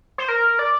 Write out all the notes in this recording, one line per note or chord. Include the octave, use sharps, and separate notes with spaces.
C5
A#4
D5